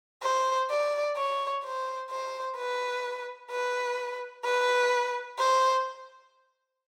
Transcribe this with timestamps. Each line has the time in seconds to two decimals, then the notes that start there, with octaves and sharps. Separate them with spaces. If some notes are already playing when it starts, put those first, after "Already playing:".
0.23 C5
0.70 D5
1.17 C#5
1.64 C5
2.10 C5
2.57 B4
3.51 B4
4.45 B4
5.38 C5